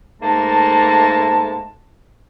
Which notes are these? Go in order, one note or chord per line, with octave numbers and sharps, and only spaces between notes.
G#2 A3 A#3 A5